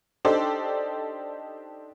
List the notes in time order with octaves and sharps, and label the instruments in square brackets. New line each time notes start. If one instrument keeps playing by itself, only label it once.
[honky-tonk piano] D4 D#4 G4 A4 C5 D5